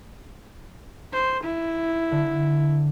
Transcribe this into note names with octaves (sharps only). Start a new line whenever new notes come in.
C5
E4
D3